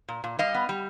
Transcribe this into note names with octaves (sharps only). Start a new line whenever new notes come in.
A#2
A#2
G3 D#5 F5
B3
G3